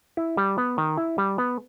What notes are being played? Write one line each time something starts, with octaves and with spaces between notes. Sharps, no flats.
E4
G3
B3
D#3
E4
G3
B3